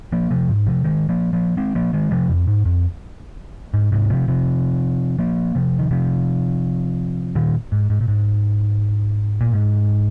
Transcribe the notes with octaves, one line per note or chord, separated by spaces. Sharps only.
F3 A#3
C3 F3
G#2
C3 F3
D#3 G#3
F3 A#3
F3 A#3
G#3 C4
F3 A#3
D#3 G#3
C3 F3
F2
G#2
F2
G#2
G#2 C3
C3 F3
C3 F3
F3 A#3
C3 F3
D#3
C3 F3
A#2 D#3
G#2
G#2
A#2
G#2
A#2
G#2